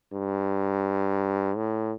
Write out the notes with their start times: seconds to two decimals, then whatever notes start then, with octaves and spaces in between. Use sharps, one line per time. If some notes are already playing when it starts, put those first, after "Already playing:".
0.13 G2
1.57 A2